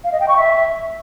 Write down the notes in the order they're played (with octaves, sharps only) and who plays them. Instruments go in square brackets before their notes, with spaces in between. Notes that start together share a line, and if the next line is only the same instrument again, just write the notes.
[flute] F5
D#5
G5
C#6
E5